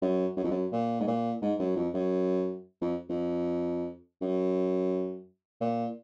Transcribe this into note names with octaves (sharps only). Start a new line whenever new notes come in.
F#2
F#2
F2
F#2
A#2
G#2
A#2
G#2
F#2
F2
F#2
F2
F2
F#2
A#2